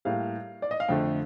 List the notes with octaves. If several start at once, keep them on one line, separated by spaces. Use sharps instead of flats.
A2 G3 A#3 F5
D5
D#5
F5
F2 D3 A3 G5